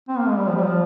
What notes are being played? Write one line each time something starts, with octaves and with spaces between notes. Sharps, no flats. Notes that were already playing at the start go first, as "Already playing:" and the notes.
C4
A#3
G#3
G3
F3
G3
F3